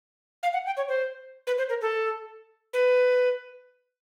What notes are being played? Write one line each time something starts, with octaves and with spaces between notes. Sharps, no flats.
F5
F#5
G5
C#5
C5
B4
C5
A#4
A4
B4